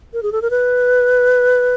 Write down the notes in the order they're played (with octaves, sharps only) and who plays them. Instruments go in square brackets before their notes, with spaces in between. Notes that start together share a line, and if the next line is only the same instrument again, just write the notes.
[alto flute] A#4
G#4
A4
A#4
B4